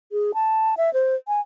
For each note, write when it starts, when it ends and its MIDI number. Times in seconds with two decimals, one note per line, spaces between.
0.12 0.32 68
0.34 0.74 81
0.77 0.92 76
0.93 1.15 72
1.28 1.40 80